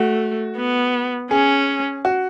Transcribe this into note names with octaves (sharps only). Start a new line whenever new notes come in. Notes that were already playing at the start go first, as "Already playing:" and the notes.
Already playing: A3 F#4
B3
C#4 G#4
F#4